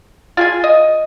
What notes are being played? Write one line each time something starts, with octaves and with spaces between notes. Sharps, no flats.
F4 G#4 G#5
D#5